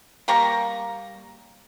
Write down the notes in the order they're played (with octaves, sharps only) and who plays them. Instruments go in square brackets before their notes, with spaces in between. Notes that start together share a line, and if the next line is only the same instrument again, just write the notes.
[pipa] G3 A#3 A#5 C#6